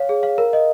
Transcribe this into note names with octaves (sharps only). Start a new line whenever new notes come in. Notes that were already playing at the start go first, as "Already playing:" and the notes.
Already playing: C#5 F5
G#4
F5
A#4
D#5